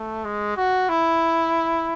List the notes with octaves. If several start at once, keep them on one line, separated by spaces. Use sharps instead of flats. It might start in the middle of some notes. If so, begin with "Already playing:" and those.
Already playing: A3
G#3
F#4
E4